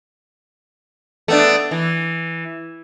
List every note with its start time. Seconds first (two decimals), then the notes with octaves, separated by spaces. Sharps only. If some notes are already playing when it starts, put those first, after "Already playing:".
1.28 A3 B3 D4
1.71 E3